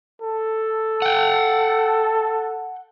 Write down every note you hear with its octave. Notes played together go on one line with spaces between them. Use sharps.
A4
F#5 G5